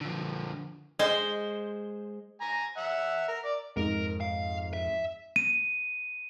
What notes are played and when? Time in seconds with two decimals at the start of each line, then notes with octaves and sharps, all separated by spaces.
0.01 D3 F3
0.99 G#3 C5
2.41 G#5 A#5
2.77 E5 F#5
3.28 A#4
3.45 D5
3.77 F2 G#2 A#4
4.21 F5
4.73 E5
5.36 D#7